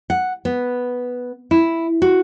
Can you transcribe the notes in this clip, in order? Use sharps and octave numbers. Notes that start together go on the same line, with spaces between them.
F#5
B3
E4
F#4